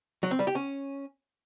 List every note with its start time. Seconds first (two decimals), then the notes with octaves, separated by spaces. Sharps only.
0.23 F#3
0.31 C4
0.39 G3
0.47 G4
0.55 C#4